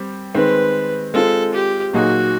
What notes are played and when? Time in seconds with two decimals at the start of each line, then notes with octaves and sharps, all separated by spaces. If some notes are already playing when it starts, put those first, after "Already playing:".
Already playing: G3 C4 G4
0.35 D#3 G#3 C4 B4
1.14 G#3 C4 F4 A4
1.54 G4
1.93 A#2 F#3 A#3 D#4 F#4 G#4